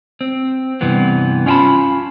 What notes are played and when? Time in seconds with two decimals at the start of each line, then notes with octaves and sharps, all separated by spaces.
0.21 C4
0.81 G2 C3 E3 B3
1.46 C#4 F4 G5 A5 B5